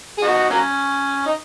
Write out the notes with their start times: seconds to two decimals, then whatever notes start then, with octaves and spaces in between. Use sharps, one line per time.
0.18 G#4
0.22 D#4 F#4
0.50 F#3 A#3 C#4
1.26 D#4